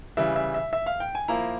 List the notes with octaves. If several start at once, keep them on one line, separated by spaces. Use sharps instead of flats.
C#3 E3 G3 E5
E5
E5
E5
F5
G5
G#5
F3 A#3 E4 A#5